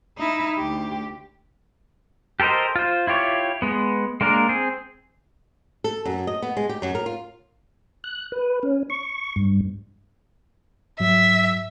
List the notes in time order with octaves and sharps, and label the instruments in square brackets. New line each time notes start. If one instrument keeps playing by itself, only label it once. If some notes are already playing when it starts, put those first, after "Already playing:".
[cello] D#4 E4
D2 G4
[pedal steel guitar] G4 A4 A#4 C5 D#5
F4 C5
E4 F4 G4 C#5
G#3 B3
G#3 A#3 D4 A#4
C4 G#4
[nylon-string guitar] A4
F#2
D#5
B3
G#3
G4
F#2
A#4
F4
[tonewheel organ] F#6
B4
C#4
C#6
G2
[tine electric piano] G#2 F#3 [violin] E5